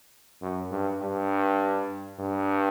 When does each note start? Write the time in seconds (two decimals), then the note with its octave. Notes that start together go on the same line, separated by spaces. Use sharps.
0.42 F#2
0.71 G2
1.02 G2
2.19 G2